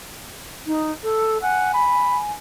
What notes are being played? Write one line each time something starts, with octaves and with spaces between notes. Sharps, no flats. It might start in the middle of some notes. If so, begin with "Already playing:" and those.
D#4
A4
F#5 G#5
B5